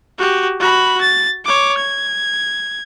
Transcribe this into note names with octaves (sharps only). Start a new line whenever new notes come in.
F#4 G4
F#4 B5
A6
C#5 D6
G#6